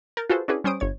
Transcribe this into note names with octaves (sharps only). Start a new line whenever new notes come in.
A#4 G6 A6
F4 F#4 G#4 A4 B4 C5
C#4 D4 E4 F#4 G#4 B4
G3 C#4 C5 D#6 D7
G1 C#5 G#6